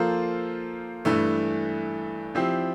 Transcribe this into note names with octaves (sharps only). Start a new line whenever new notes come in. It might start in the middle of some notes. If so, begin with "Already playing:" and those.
Already playing: F3 A#3 F4 A4 C5
G2 E3 A3
F3 C4 E4 G4